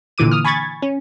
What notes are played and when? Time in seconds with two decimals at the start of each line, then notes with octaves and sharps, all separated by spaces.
0.18 A#2 D3 E3 D6 D#7
0.31 D#6 F6
0.45 G#5 B5 C#6 G#6 A6
0.82 C#4